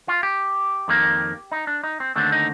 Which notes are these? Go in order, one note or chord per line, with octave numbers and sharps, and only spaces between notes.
F4
G4
F2 D#3 A#3
D#4
D4
D#4
C4
D#2 D3 A3 C4 D4
D#4